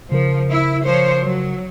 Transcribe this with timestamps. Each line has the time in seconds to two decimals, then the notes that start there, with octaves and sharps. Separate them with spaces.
0.12 C#3 F3 A#4
0.49 E4
0.83 F3 C5 C#5
1.21 F#3